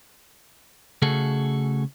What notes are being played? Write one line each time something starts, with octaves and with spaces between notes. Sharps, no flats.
C#3 A3 F#4 G#4 A4